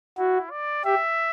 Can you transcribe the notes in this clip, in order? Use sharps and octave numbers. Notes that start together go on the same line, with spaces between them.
E4 F#4
D5
G4 E5